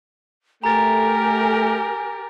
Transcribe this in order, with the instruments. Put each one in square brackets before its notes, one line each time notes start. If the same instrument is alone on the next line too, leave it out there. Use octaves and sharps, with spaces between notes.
[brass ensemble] A3 [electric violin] G4 A#4 [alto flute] G#5 [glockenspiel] A#5 A6